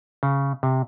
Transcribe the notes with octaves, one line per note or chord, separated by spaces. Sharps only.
C#3
C3